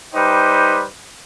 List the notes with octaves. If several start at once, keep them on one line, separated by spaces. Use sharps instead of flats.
G3 D#4 B4 C5 G5 D6